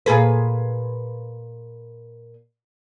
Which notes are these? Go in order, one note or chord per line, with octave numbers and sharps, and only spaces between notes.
A#2 G#4 B4